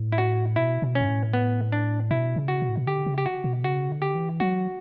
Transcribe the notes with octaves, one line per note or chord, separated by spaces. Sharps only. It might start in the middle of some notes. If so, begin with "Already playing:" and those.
Already playing: A2
E4
F#4
B2 E4
B2
C#4
G2
A2
B3
D4
B2 E4
C#3
F#4
B2
A2
B2
D3 G4
C#3
G4
F#4
B2
C#3 F#4
D3
G4
E3
F#3 F#4